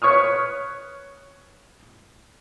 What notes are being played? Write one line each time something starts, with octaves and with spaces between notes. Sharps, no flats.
B4 C#5 C#6 D#6 F6